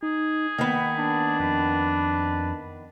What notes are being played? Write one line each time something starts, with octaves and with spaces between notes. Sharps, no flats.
D#4 G#4
D#3 A#3 B3
D4
F2 B4